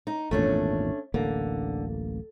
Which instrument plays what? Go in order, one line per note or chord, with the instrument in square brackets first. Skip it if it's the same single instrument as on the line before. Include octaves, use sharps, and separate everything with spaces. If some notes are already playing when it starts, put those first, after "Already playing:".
[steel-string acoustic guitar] D#4
[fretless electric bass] G#1 E2 A#2 [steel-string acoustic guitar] A3 C#4 D4
[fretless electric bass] D1 A1 A#3 [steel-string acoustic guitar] D3